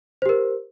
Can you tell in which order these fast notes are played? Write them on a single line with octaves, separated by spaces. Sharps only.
C5 G4 A#4